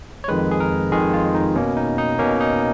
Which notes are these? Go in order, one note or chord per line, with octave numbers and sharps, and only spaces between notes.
C#5
F2 D#3 G#3 B4
G#4
A#4
F2 D#3 G#3 G#4
F4
D#4
B2 A#3 C#4
D#4
D#4
B2 A#3 C#4
D#4